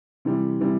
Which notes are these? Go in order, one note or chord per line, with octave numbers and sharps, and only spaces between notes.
C3 E3 G3
C3 E3 G3